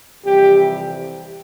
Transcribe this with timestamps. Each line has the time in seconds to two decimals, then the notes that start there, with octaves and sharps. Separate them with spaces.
0.25 F2 C3 E3 G3 G4